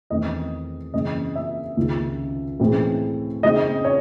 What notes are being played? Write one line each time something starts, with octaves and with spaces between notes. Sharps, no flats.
E2 D#3 A3 C4 D#5
F#2 C#3 E3 G#3 C4 D#5
E5
C#2 C3 D#3
A2 E3 G#3 C4 E4
C#3 G#3 C4 D#4 D#5
C#5